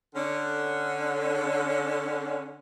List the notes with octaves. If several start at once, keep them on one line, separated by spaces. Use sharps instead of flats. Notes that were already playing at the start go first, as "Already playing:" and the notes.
D3 C#4